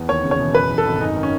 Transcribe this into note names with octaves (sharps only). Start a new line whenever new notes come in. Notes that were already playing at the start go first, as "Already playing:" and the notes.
Already playing: E2
D#2 C#5
C#3
C#5
E1
F#2 B4
E3
A4
G#1
F#2 D#4
D#3
C#4